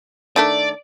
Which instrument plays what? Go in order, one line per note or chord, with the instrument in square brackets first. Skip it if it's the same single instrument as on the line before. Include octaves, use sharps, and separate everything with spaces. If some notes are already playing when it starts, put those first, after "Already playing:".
[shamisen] D#3 A3 D4 [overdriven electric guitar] D5